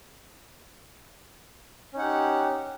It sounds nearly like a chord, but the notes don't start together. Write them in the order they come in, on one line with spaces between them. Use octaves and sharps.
C#4 D#4 F#5 G4